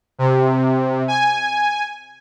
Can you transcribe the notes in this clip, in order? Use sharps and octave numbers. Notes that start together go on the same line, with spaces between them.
C3
G#5